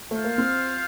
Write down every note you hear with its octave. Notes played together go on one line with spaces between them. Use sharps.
A3 F4 C5 F5
A#3
C4